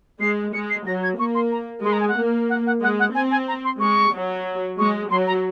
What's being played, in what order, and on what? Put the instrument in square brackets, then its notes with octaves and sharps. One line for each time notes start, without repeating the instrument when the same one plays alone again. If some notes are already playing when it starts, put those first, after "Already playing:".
[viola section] G#3 [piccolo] C7
[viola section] G#3 [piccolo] C#7
[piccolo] C7
[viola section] F#3 [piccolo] A#6
[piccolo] G#6
[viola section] A#3 [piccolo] C#6
[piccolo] C6
A#5
[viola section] G#3 [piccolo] C6
[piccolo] A#5
G#5
F#5
[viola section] A#3
[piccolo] F#5
F#5
[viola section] G#3 [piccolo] F#5
[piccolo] F#5
[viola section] C4 [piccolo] G#5
[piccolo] G#5
A#5
C6
[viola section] G#3 [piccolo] C#6
[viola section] F#3
[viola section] G#3 [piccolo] C#6
[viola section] F#3 [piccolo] C6
[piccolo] A#5